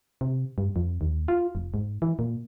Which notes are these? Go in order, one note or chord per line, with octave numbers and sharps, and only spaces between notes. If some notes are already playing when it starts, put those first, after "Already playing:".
C3
G2
F2
D#2
F4
F1
G#2
E3
A#2